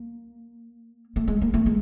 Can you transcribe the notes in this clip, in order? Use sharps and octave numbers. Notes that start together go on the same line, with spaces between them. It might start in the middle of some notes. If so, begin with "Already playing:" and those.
Already playing: A#3
A3
G#3
A#3
A3
G#3